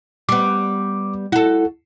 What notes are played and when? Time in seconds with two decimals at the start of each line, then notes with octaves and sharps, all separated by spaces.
0.29 G3 B3 D6
1.32 E4 F#4 A4